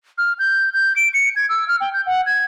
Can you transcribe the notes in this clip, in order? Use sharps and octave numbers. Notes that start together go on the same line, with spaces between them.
F6
G6
G6
D7
C#7
G#6
E6
F6
G5
G6
F#5
G#6